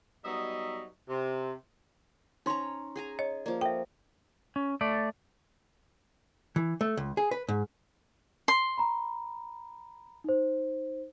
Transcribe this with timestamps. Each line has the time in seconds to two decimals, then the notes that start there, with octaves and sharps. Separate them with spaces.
0.25 F#3 G3 B3 D#4 D#5 E5
1.09 C3
2.46 C#4 D#4 C#5 A#5 C6
2.96 G#4 G#5 A#5
3.19 C#5 D#5
3.46 F3 A#3 D5
3.61 A4 E5 G5
4.56 C#4
4.81 A3 D5
6.56 E3
6.81 A3
6.97 C#2
7.17 G#4
7.31 B4
7.48 G#2
8.48 C6
8.78 A#5 B5
10.24 D#4 C5